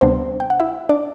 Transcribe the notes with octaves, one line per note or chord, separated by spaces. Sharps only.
D2 C3 G3 B3 C4 D4 C5
G5
F#5
E4 E5
D4 D5